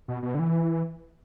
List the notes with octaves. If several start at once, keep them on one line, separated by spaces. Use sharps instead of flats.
B2
B2
D3
E3